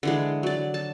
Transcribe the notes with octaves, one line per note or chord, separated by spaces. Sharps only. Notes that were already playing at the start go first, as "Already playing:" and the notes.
D3 E3 G#3
F#3 D5
A5